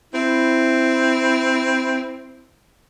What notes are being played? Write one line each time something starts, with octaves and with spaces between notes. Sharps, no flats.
C4 E4